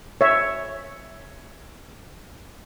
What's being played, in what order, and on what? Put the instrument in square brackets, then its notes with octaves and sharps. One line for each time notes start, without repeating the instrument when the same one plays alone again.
[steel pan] C#5 E5